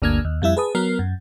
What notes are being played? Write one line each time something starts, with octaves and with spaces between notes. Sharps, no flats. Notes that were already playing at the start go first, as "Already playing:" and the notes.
G1 D2 D3 A#3 F6 G#6
D#2
F2 G3 E4 E5
G#4 B4 A5 D#6
F#3 B3 A#4 F6 C7
F#2